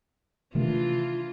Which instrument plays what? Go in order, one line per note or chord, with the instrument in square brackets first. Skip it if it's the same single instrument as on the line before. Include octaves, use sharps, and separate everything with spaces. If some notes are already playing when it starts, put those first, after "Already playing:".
[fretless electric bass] C3 D#3 A3 [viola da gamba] E3 D4 F4